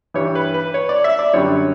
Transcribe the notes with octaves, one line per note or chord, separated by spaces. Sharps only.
G2 E3 G3 C#5
B4
B4
C#5
D5
E5
D5
F#2 D3 G3 C#5